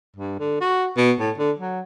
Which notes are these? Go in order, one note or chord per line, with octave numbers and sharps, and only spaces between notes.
G2
D3
F#4
B2
A2
D3
F#3